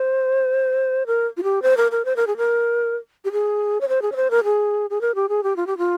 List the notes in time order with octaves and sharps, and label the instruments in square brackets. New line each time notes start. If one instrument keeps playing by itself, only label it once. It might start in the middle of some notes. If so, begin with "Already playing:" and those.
Already playing: [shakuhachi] C5
A#4
F4
G4
C5
A#4
A#4
C5
A#4
G#4
A#4
G4
G#4
C#5
C5
G#4
C#5
C5
A#4
G#4
G#4
A#4
G4
G#4
G4
F4
G4
F4